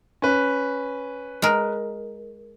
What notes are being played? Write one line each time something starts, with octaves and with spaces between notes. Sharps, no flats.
C#4 B4
G#3 A#4